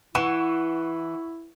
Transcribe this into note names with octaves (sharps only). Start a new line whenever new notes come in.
E3 E4 F#5 C#6 E7